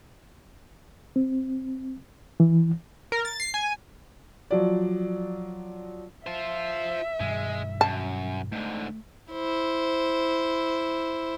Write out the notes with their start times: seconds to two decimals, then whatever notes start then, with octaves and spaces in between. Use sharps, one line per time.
1.16 C4
2.40 E3
3.12 A#4
3.25 A6
3.40 C7
3.54 G#5
4.51 F3 F#3 D5
6.27 F4 C5 E5
7.20 G2 B2 D#3 G#3
7.81 F#2 A5
8.52 G#2 D3 A3
9.32 E4 C5